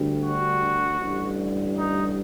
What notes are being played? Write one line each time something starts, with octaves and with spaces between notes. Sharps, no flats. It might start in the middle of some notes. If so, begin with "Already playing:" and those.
Already playing: D2 D3 G3
F#4
A1 G2 D3 G3
D#4